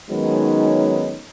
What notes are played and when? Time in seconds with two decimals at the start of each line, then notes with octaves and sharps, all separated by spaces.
0.11 D#3 F#3 G#3 B3 C#4 D#4